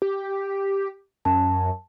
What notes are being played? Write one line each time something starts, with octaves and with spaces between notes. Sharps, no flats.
G4
F#2 A5